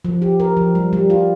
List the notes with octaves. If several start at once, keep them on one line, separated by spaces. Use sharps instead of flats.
F3
G4
A#4
F3
G3
G3
F4